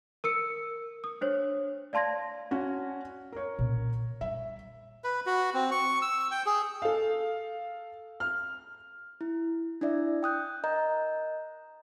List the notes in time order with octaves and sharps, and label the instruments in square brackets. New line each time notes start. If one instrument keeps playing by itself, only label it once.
[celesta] A#4 E6 C#7
D#6
D4 C5 C#5
D5 F5 A5 C6 G#6 A#6
[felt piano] C#4 F#4
A#4 C#5
[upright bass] A#2 C#4
[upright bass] G3 [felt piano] E5
[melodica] B4
F#4
C4
C#6
E6
G5
G#4
[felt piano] A4 F5
F6
[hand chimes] E4
D4 E4 D5 E5
G5 D#6 F#6 G6
A#4 D#5 A#5 G6